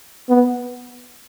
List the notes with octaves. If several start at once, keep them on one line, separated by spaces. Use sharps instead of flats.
B3